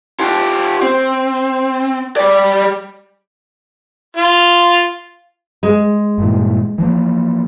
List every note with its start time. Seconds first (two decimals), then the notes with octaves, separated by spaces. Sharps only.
0.20 F4 G4
0.82 C4
2.16 G3 D5
4.17 F4
5.63 G#3
6.18 G2 A#2 E3
6.78 E3 F3 A#3